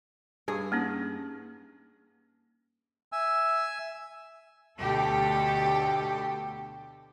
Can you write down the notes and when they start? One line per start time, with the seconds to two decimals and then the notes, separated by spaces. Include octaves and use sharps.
0.48 G2 G#4
0.72 A#3 C#4 D#4
3.12 E5 G#5 E6
4.78 D2 B2 G4 A4